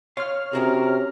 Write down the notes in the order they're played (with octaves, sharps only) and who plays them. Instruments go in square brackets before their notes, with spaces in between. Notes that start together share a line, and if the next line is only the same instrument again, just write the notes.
[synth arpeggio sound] C#5 F6 [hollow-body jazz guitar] F5 C6
[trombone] C3 [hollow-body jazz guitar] C#4 F#4 G#4 [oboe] A#4